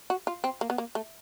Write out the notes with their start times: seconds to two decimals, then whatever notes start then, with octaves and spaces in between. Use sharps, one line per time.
0.10 F#4
0.27 F4
0.44 C4
0.61 A#3
0.70 B3
0.78 A#3
0.95 A3